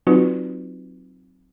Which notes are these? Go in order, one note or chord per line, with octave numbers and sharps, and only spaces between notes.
F#3 C4 D#4 F4 F#4 B4